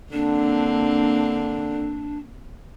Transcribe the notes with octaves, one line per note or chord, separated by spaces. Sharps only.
D3 A#3 C4 D4